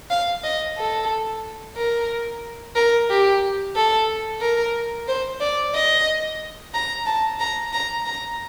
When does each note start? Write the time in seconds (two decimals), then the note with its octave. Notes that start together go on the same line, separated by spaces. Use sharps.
0.10 F5
0.44 D#5
0.78 A4
1.76 A#4
2.75 A#4
3.09 G4
3.76 A4
4.41 A#4
5.08 C5
5.40 D5
5.74 D#5
6.74 A#5
7.06 A5
7.39 A#5
7.73 A#5
8.05 A#5